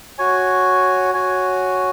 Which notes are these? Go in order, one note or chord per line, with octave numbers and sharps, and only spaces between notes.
F#4 C#5 G#5
F#4 C#5 G#5